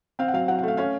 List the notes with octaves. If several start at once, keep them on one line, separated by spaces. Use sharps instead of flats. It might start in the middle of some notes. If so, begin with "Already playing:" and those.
C4 F5
F#5
F#3 F5
F#3 F#5
F#5
A3 F5
C#4 F5